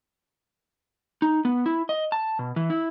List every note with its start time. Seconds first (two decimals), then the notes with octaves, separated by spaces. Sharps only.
1.22 D#4
1.45 B3
1.66 E4
1.89 D#5
2.12 A5
2.39 B2
2.56 E3
2.70 E4